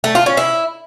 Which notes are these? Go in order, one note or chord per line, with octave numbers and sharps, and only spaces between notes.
A3
F4
C#4
E4